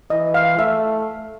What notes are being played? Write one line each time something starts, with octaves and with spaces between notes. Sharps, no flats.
E3 D#5
F5
A3 E5